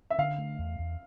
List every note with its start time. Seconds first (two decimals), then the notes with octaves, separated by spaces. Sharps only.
0.10 E5
0.18 D3 F5
0.38 A3
0.59 E2
0.79 E2